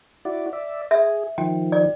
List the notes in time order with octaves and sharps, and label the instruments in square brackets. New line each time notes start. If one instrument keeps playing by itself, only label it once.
[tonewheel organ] E4 F#4 D5
D5 E5
[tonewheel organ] G#4 [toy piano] E5
[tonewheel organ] D#3 F3 [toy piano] G5
[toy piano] D5